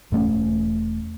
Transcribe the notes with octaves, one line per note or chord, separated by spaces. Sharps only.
E1 G2 A3 C#4